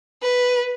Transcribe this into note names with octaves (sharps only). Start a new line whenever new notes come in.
B4